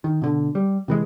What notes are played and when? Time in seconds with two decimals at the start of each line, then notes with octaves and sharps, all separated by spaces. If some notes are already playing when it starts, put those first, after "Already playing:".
0.04 D#3
0.22 B2 D3
0.55 G3
0.88 C3 E3 G#3